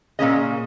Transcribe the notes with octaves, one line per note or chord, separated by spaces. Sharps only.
A#2 A#3 C#4 G#4 D#5